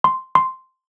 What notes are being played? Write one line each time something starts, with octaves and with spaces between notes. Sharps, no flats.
C6
C6